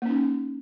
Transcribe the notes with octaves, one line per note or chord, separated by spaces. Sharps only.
A#3 C#4 D#4